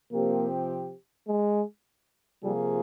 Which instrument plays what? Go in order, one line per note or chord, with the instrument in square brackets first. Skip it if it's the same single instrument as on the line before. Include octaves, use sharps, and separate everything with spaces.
[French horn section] C3 F3 C4 G4 [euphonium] A#3
[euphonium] G#3
[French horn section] C3 F3 A#3 F4 G#4 [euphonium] G3